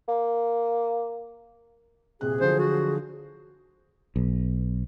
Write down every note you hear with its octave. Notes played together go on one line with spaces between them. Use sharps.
A#3
D#1 C3 G#4 F#6
D3 F3 F#3 C5
F#4
B1